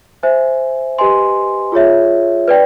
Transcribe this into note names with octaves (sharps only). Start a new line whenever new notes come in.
C5 E5 G#5
G4 B4 D#5 G#5 C6
F4 G#4 C#5 E5
B4 D5 G5